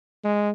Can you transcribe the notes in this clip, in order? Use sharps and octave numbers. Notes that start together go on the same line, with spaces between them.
G#3